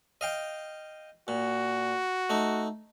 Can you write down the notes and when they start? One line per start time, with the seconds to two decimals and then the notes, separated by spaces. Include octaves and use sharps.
0.21 D#5 F5 G5
1.28 A#2 F#4
2.30 A3 D#4